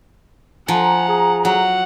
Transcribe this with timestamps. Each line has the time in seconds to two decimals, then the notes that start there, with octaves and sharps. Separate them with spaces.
0.68 F3 F#5 G#5 A#5
1.08 G#4
1.45 F#3 F#5